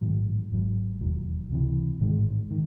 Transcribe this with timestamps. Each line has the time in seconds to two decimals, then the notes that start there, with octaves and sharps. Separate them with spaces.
0.01 A1 G#2 D#3 F#3
0.51 G#1 G#2 F#3
1.01 E1 D#2 D#3 F#3
1.49 C#2 C3 E3
1.99 A1 G#2 D#3 G#3
2.51 D#3